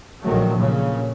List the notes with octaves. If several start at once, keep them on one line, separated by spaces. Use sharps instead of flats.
A#1 D#3 F#3 A3
A#2 C#3